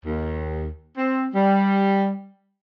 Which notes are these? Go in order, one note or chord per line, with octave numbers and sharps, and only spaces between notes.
D#2
C4
G3